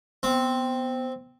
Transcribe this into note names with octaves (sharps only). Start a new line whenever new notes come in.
B3 C4 G5